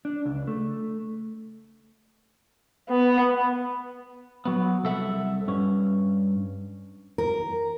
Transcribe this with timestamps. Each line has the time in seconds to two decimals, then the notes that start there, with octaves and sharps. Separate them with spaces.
0.05 D4
0.25 C#2
0.47 A3
2.89 B3
4.45 F#3 B3
4.84 C2 A4 E5 F#5
5.48 G2 C#4
7.18 A#4